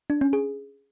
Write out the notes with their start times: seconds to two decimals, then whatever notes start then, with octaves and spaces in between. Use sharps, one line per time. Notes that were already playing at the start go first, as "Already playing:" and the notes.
0.10 D4
0.21 C#4
0.33 G#4